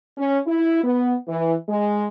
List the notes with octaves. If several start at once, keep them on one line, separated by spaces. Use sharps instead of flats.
C#4
E4
B3
E3
G#3